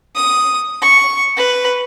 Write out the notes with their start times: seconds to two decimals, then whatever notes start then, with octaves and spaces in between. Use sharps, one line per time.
0.15 D#6
0.82 C#6
1.37 B4